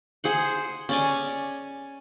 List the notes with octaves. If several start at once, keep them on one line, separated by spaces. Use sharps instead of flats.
G#4 C5 F#5
C#4 D5 G#5